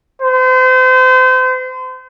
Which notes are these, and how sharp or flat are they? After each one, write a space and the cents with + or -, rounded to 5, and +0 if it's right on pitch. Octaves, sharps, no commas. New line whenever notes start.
C5 -35